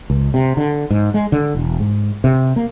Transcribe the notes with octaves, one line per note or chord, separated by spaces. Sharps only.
C#2
C3
D3
G#2
G#3
D3
E1
G#2
C3
A#3